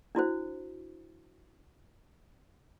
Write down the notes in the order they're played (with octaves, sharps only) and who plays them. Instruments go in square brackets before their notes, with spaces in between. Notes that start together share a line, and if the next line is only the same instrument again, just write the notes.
[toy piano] D4 E4 F#4 C5